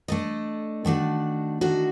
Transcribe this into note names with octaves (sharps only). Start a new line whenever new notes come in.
A3 D4 A4 D#5
D#3 A3 D4 F#4
D#3 A3 D4 F#4